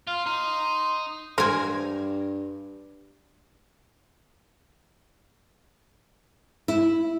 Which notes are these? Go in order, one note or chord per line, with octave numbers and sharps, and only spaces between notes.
F4 F5
D#4 C6
G2 A#4 C5 G#5
E4